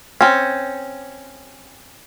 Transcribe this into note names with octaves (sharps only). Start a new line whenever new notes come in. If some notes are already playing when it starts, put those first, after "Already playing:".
C4 C#4